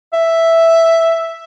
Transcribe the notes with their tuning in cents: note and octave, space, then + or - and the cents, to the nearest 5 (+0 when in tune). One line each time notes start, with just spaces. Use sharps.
E5 +0